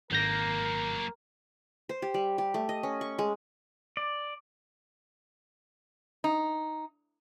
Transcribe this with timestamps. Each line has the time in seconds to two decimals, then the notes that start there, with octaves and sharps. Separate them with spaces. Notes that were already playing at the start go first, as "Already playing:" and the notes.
0.11 G#1 F#3 A#3 A#4 G6 A#6
1.89 C5
2.02 G4
2.14 G3
2.38 G4
2.54 A3
2.69 D#5
2.83 C#4
3.01 C#6
3.19 G#3
3.97 D5
6.24 D#4